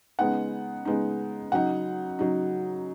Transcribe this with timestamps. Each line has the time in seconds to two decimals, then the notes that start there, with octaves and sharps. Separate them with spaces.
0.19 C#3 G#3 B3 D#4 F#5
0.85 C#3 G#3 B3 D#4
1.52 C#3 F#3 D#4 F#5
2.19 C#3 F#3 D#4